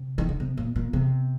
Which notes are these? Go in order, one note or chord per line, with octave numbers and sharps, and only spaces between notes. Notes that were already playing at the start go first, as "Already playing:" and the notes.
Already playing: C3
D#3
D3
C3
A#2
A#2
C3